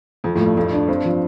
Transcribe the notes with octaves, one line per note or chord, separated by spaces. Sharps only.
F2 F3
F2 A2
A3
G2
F2 A3
D4
G2 C4
F3